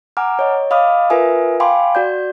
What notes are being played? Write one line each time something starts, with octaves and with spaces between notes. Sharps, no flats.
F#5 G#5 A#5 D6 F6
C#5 D#5
D#5 F5 B5 D6 D#6 F6
F4 A#4 B4 E5 G#5 D#6
F5 G5 G#5 B5 C6 D6
F#4 D5 G6